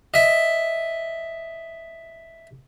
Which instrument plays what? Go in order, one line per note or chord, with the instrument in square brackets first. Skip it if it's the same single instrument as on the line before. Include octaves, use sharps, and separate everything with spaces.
[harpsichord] D#5 E5